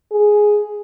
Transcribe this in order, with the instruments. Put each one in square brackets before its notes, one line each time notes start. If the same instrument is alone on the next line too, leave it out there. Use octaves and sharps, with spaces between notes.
[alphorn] G#4